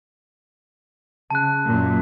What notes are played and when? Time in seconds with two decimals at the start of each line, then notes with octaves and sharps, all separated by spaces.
1.30 C#3 A5 F#6
1.64 F#2 A#2 F#3